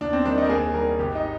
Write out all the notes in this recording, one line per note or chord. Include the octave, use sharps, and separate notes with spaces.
D#2 D4
C4
D#3 G3 D4
D#4
A#4
D#2 G#4
D#3 G3 A#4
G#1 G4
D#4